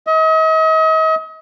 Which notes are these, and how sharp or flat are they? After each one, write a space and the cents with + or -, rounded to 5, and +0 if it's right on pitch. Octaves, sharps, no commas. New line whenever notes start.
D#5 +40